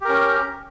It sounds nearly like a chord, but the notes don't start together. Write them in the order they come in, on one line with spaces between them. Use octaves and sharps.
G4 A#4 C#4